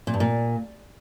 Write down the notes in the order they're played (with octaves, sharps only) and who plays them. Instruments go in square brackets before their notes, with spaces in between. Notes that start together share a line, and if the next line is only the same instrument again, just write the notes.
[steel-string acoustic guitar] A#2
G2
A#2